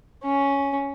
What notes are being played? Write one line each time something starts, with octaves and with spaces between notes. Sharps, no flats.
C#4